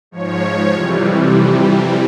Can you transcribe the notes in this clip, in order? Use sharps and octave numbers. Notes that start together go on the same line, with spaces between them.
G#2 F3 C#5
F2 C3 E3 G3